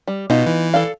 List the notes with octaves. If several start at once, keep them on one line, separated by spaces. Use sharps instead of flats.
G3
B2 B3 D#4 F4
E3
A4 D5 F5